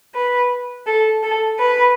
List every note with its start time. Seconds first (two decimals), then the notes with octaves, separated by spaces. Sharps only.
0.15 B4
0.86 A4
1.23 A4
1.59 B4